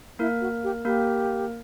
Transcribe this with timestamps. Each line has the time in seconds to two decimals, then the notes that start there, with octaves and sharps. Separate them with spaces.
0.19 A#3 E4 A#4
0.41 F#4
0.64 G4
0.85 A#3 G4 A#4